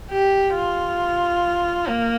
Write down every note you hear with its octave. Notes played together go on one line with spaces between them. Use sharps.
G4
F4
A#3